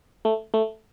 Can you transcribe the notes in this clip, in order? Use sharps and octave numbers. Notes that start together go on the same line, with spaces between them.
A3
A3